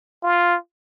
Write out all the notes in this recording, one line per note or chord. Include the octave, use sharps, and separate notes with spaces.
F4